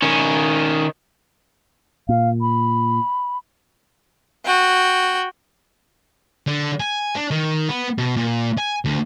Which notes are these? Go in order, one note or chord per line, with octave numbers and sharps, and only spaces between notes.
D#3 C#4
A#2 F5
B5
F#4 G5
D3
G#5
D4
D#3
B3
B2
A#2
G#5
D2